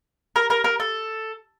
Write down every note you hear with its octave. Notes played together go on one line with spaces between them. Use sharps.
A#4
A#4
A#4
A4